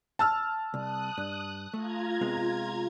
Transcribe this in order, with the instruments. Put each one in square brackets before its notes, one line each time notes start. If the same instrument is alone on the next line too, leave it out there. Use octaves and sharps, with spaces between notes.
[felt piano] A5 E6 F6
[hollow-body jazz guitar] C2 [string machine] D#6 F#6
[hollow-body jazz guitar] G2
[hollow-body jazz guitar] A3 [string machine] F4 A#5 G#6
[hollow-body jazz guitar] C3 G#3 B3